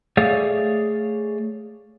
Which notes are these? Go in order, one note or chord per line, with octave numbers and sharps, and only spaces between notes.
A3 G#4 C#5 D5 F5